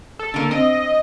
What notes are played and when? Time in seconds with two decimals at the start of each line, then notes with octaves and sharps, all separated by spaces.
0.19 A4
0.34 D3 A#3
0.51 C4 D#5